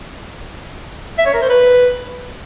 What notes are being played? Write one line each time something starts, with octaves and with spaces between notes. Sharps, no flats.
E5
C#5
A#4
C5
B4